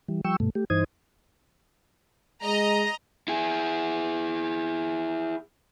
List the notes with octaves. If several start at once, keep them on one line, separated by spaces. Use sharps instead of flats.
E3 G3
F3 G3 G5 C#6 E6
G2 B2 A3
A3 G4
G2 E3 D#4 C5 D#6 G#6
G#3 D#5 A#5
E4 G#4